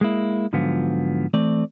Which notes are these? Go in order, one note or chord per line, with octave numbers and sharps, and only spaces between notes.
G#3 A#3 E4
G#2 D3 F3 F#3 B3 F4
E3 A3 C4 D5